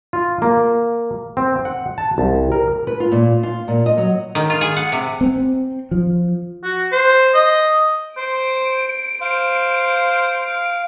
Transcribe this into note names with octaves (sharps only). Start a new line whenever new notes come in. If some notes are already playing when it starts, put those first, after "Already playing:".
F4
A#3
C4
F#5
A5
C2
A#4
B4
F4
A#2
F4
A#2
D#5
F#3
D#3
F4
G#4
F#5
C3
C4
F3
F#4
C5
D#5
C5 D7
C5 F5